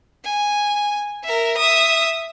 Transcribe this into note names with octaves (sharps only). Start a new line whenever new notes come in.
G#5
A#4 E5
E5 D#6